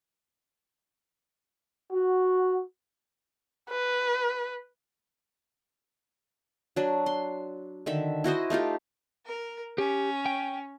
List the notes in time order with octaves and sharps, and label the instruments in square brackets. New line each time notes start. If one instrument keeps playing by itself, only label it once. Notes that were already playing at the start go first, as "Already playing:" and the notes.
[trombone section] F#4
[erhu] B4
[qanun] F#3 D4
C6
D3 D#3 E5
E4 F#4 C5 D#5
A3 D#4 F4 G4
[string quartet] A#4
[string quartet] C#4 [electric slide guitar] G4
[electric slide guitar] G5